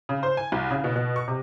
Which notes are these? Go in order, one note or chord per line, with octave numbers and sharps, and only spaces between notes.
C#3
C5
G#5
C2
C#3
B2
B2
C#6
C3